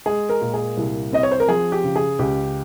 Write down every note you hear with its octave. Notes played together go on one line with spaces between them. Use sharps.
G#3 G#4
A#4
A#2
G#4
C2
C4 D#5
C#5
C5
A#4
F3 G#4
G4
C#3
G#4
C#2 G4